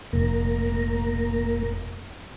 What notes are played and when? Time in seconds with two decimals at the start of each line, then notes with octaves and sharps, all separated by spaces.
0.13 F1 A#2 A#3 A#5